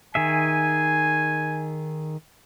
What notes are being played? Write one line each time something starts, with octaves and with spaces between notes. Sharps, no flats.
D#3 G#4 E5 G#5